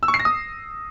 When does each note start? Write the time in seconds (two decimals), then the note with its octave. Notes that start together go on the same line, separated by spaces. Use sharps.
0.03 E6
0.08 C#6
0.14 C7
0.20 A#6
0.25 D#6